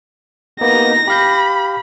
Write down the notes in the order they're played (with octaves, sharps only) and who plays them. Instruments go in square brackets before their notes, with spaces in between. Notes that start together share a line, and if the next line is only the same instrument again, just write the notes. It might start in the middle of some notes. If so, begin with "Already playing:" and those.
[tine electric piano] A#3 B3 [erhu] D#4 [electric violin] A#6
[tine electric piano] G4 F5 G6 [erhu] B5